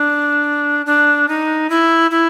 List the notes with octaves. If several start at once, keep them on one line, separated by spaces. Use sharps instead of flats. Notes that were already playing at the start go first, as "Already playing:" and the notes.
Already playing: D4
D4
D#4
E4
E4